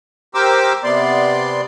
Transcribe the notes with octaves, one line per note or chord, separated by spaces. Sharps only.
G4 A#4 C5 D6 E6
C3 B3 D5 C6